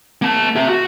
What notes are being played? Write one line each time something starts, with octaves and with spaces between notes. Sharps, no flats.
A#3 A5
G4 E5
F#4